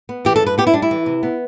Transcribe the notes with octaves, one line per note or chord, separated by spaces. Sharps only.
B3
E3 G4
A4
G2 B4
B3 G4
E4
G3 D4
E4
E3
C3
B3